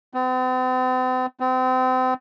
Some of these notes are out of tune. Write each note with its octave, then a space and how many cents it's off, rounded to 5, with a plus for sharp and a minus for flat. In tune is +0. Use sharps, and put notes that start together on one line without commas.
C4 -45
C4 -35